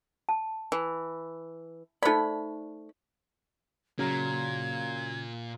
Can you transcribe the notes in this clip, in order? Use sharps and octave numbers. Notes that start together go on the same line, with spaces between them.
A5
E3
A3 D#4 C5 D5 B5
A#2 C#3 F#3 A#5 G#6